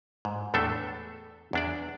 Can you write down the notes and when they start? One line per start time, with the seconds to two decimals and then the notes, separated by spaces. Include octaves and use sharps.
0.25 G#2
0.54 E2 A2 A3 D4 A4 E5
1.53 E2 D4 D5